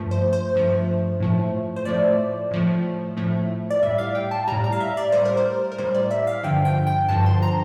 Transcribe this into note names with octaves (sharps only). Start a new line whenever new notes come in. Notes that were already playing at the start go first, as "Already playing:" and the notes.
Already playing: G2 F3 A3
C5
C5
G2 F3 A3
A2 F3 A3
C5
A2 F3 A3 D5
A2 F3 A3
A2 F3 A3
D5
A2 G3 E5
F5
G5
A5
A2 G3 A#5
A#5
F5
E5
D5
A2 G3 C5
A#4
C5
A#4
A2 G3 C5
D5
E5
F5
G2 D3 F3 G5
G5
G5
G2 D3 F3 A5
C6
A#5